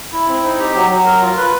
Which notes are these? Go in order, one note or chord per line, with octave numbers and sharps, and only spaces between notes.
E4
C4
D#4
G4
F#3
F#3
A#4
F4
B4